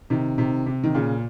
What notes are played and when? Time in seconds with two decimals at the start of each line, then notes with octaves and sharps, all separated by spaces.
0.10 C3 D#3
0.38 C3 D#3
0.66 C3
0.84 D#3
0.94 A#2 C#3